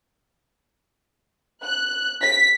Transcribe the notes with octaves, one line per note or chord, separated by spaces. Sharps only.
F#6
B6